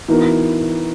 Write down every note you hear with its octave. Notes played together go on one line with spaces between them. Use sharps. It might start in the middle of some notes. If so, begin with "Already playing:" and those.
E3 B3 D#4 F#4 A#4